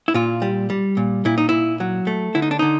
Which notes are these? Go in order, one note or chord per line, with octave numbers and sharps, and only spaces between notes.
E4
A#2 F4
G3
G3
A#2
A#2 E4
D#4
A#2 E4
F#3
A3
D3 E4
D#4
D4
D3 D#4